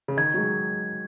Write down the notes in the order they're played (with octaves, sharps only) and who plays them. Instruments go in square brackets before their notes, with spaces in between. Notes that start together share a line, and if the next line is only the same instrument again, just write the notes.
[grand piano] C#3
[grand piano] D#3 [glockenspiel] G#6
[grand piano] F#3
G#3